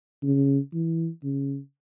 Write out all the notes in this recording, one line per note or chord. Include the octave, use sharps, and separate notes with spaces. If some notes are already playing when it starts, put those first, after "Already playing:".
C#3
E3
C#3